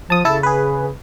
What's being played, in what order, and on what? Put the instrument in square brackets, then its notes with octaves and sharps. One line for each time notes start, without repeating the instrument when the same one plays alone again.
[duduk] F3 [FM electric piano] A5 D#6
[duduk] C#3 [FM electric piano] E4 A4 A5
[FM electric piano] G#4 B4